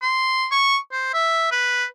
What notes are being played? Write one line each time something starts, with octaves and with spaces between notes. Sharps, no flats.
C6
C#6
C5
E5
B4